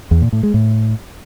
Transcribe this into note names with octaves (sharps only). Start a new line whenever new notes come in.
E2
A#2
A2
G#3
A2